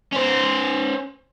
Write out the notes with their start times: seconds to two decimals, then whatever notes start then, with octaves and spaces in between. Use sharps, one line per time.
0.13 C#4 C5